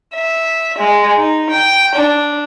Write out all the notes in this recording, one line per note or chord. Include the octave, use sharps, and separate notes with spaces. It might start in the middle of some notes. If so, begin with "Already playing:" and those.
E5
G#3
D#4
G5
D4